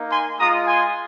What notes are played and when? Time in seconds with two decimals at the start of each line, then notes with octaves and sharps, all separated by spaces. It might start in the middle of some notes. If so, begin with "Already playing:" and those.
Already playing: A#3 D#4
0.10 G#5 C6
0.38 G#3 F4 A#5 D#6
0.67 G#5 C6